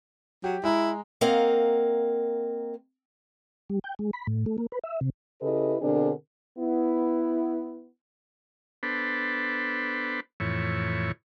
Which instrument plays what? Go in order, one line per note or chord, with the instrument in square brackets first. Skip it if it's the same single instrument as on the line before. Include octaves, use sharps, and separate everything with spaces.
[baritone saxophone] F#3 [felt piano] G4
[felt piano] G#3 A#5 [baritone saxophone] E4
[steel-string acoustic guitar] A#3 C4 A#4 D#5 F5 F#5
[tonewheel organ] G3
G5
G#3
B5
A2
A3
A#3
B4
E5
C3
[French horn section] C#3 E4 G4 A4 B4 D#5
B2 D3 C4 D4 G#4 A#4
B3 E4
[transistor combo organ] B3 D4 A4 B4 C5
F2 A2 E3 C#5